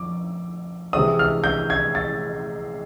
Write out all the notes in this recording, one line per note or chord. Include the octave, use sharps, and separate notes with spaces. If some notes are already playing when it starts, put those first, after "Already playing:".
Already playing: F2 D6
C3 E3 G#3 C4 D#6
F6
G6
G#6
A6